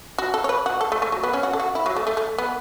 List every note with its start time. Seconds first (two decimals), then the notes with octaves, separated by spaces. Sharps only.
0.18 F#4
0.34 A4
0.44 C#5
0.49 B4
0.66 F#4
0.81 A4
0.92 A3
1.02 A3
1.12 F#3
1.23 B3
1.33 C#4
1.43 F#4
1.53 A4
1.60 F#4
1.75 E4
1.86 F#3
1.96 A3
2.07 A3
2.17 A3
2.38 B3